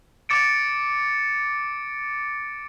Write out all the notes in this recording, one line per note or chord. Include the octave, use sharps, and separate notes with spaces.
D6 A6 C#7 D7